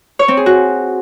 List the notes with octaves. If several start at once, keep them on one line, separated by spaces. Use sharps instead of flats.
C#5
C4
G#4
F#4